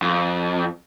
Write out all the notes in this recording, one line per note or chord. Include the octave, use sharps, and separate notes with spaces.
F2